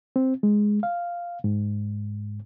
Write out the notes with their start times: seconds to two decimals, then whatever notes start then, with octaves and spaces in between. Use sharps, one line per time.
0.16 C4
0.43 G#3
0.83 F5
1.44 G#2